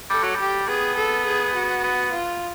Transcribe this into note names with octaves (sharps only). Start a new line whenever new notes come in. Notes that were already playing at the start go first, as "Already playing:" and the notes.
G3 A4
F#3
G3 G4
B3 G#4
A4
G#4
F#4
B3
F4